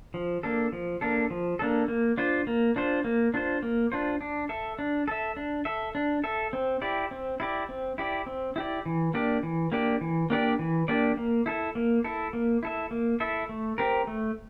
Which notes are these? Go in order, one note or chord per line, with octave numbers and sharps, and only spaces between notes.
F3
A#3 D4 A4
F3
A#3 D4 A4
F3
A#3 D4 A4
A#3
D4 F4 C5
A#3
D4 F4 C5
A#3
D4 F4 C5
A#3
D4 F4 C5
D4
A4 E5
D4
A4 E5
D4
A4 E5
D4
A4 E5
C4
E4 G4 D5
C4
E4 G4 D5
C4
E4 G4 D5
C4
E4 G4 D5
E3
A#3 D4 G4 D5
E3
A#3 D4 G4 D5
E3
A#3 D4 G4 D5
E3
A#3 D4 G4 D5
A#3
E4 A4 E5
A#3
E4 A4 E5
A#3
E4 A4 E5
A#3
E4 A4 E5
A3
C4 G4 A#4
A3